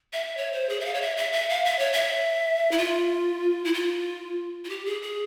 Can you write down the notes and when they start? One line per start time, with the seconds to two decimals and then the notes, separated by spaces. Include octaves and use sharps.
0.13 E5
0.37 C#5
0.53 C5
0.69 G#4
0.80 E5
0.85 F5
0.94 C#5
1.02 E5
1.17 E5
1.33 E5
1.49 F5
1.65 E5
1.79 C#5
1.93 E5
2.72 E4
2.78 F4
3.65 E4
3.74 F4
4.65 F4
4.70 G4
4.86 G#4
5.02 G#4